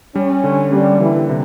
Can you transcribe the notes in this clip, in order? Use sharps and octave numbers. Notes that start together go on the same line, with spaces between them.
G3 C#4
D3
G3 A#3
D3 E3
C3